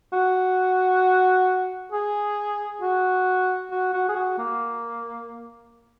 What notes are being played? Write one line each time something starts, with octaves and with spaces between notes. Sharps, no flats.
F#4
G#4
F#4
F#4
F#4
G#4
F#4
A#3